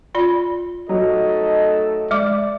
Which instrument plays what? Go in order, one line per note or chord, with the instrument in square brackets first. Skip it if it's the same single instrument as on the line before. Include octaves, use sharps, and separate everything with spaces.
[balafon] F4 D5 B5
[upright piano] F#3 [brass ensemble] A3 D#4 A4 [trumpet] D#5
[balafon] G#3 D6 [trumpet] D5